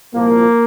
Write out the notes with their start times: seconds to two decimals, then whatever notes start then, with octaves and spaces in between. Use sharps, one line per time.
0.14 C2 A#2 F3 A#3